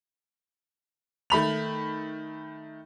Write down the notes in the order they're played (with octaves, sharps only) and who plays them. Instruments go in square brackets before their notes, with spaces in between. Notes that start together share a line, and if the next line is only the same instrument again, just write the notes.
[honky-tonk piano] D#3 A3 B5 F7